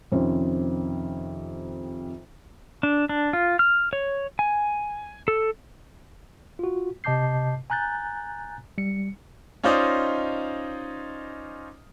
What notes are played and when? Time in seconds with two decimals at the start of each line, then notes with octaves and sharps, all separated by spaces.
0.12 F2 C3 D#3 C#4 C5
2.83 D4
3.09 D4
3.33 F4
3.59 F6
3.93 C#5
4.39 G#5
5.28 A4
6.59 F4 F#4
7.04 C3 D#5 A5 D6 G6 C7
7.70 G#5 A#5 F#6 G6 A6
8.78 G3 C#7
9.63 C#4 D#4 F4 C5 D5 D#5